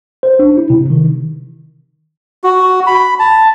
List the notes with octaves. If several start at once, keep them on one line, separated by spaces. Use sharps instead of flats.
C5
D4
E4
C3
D#3
F#4
B5
A5